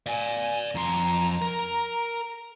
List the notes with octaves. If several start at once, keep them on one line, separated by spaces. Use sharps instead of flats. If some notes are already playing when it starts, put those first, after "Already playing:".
D5 F5 G#5
F2 A#5 C6
A#4